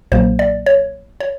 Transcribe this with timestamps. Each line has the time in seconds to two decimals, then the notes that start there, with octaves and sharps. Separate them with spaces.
0.12 B1 A#2 F#3 A#3 C5
0.39 D5
0.66 C#5
1.20 C#5